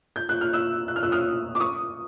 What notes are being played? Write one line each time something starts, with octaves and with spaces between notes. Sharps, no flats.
G6
F#6
F6
E6 F#6
F#6
F6
E6 F#6
D#6 F6
D6
C#6 D#6